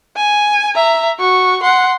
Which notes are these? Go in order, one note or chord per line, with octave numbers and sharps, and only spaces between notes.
G#5
E5 A#5
F#4 C#6
F#5 C6